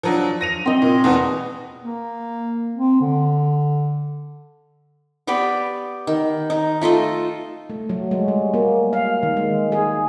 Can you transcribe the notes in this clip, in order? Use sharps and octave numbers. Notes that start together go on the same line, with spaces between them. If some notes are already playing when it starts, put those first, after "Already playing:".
F3 F#3 D4
A#6 D#7 F7
C4 D#5
A#2
E2 B2 B3
A#3
C4
D3
B3 G4 B4 D5
D#3
D#4
A3 F4 A4 D#5
A3
F#3
G#3
G3
A#3
F5
D#3
G#3
G#4